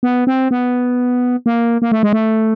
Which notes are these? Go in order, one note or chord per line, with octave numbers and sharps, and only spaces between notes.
B3
C4
B3
A#3
A#3
A3
G#3
A3